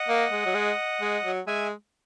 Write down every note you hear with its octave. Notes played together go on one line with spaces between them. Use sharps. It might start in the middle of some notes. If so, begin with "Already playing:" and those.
Already playing: D#5 F#5
A#3
G#3
F#3
G#3
G#3
F#3
G#3 E5 G#5